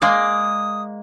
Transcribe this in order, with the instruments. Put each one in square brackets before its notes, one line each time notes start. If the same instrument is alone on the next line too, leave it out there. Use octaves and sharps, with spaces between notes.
[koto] G#3 A#3 D5 [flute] D#6